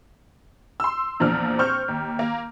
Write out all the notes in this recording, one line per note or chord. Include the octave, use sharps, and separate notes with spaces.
C6 E6
E2 A#2 F3 D4 F6
C4 C#6 F6 G6
D#2
A#3